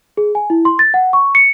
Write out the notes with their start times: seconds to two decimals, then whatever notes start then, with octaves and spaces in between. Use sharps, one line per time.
0.17 G#4
0.35 G#5
0.50 E4
0.65 C6
0.79 A6
0.94 F#5
1.13 C#6
1.35 C#7